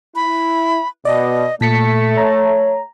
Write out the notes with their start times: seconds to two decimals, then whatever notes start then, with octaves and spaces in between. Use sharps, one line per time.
0.16 E4 B5
1.05 B2 D5 D#5
1.61 A#2 A3 A5 B6 C#7
2.18 C#5 A#5